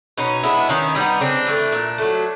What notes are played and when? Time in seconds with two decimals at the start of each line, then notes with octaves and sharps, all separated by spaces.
0.17 B2 C#4 D#4
0.43 G#3 B3 D4 E4
0.69 D#3 C#4 D#4
0.95 G3 C#4 D#4
1.00 B3
1.20 C#3 C4 D4
1.47 E3 A3
1.72 A#2
1.98 F#3 A3